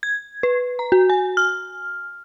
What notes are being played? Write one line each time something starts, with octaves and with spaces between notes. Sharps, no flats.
G#6
B4
A#5
F#4
G#5
F6